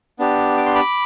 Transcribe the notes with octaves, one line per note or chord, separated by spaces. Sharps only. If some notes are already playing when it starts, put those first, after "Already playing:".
B3 D4 G4
D6
C6
B5 D6